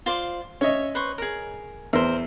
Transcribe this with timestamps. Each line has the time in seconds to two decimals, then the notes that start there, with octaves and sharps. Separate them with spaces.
0.06 F4 C5 D5
0.61 C#4 C#5 D#5 E5
0.95 B4 C5 C#6
1.18 G#4 A#4
1.93 E2 A#4 C5